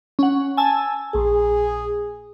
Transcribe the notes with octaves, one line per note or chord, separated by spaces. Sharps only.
C#4 F#5
G#5 A5 E6
A#1 G#4